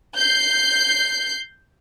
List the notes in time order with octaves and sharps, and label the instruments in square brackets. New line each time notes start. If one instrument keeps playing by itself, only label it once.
[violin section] G6 C7